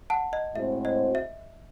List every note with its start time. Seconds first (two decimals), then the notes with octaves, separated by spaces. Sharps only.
0.10 F#5 A5
0.33 D#5
0.55 A2 G#3 C4 F#4 C5 E5
0.85 D#5
1.15 E5